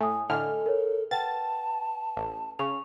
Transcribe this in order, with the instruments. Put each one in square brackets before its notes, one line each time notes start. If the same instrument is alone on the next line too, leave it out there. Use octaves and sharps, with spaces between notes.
[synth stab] A2 [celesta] G#5 D#6
[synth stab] A2 D3 F6 [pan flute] A4 [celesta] D#5 G#5
[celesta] A#4 C#5
[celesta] B4 F#5 G5 [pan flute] A5 [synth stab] A6
[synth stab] A1
[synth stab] C#3 [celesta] C#6 F7